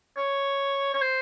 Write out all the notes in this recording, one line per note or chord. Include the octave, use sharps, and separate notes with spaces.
C#5
C#5
C5